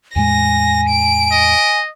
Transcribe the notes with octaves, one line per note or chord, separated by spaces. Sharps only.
E2 A2 G#3 G#5 A#6
D7
D#5